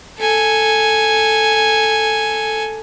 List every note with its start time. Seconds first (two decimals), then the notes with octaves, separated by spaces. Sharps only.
0.19 A4 G#5